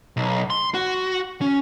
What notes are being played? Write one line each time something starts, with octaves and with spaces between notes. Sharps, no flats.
B1
C6
F#4
C#4